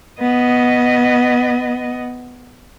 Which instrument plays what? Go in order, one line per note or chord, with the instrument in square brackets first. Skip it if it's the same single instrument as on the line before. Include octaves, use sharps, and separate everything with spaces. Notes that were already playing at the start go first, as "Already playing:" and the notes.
[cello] B3 D#5